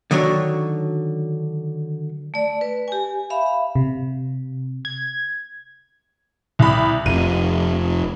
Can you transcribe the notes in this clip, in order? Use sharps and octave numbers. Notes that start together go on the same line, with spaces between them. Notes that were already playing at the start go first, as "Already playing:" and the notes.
D3 D#3 F#3 D4 C#5
A3 D5
B4
G4 G#5
E5 F5 B5
C3
G#6
C2 B5
F1 D#7